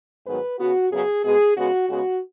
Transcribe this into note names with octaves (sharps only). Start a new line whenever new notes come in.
G#2 D#3 F#3 B3 B4
C#3 B3 F#4
F#2 C#3 F#3 B3 G#4
B2 G#3 B3 G#4
C#3 G#3 B3 F#4
C#3 G#3 B3 F#4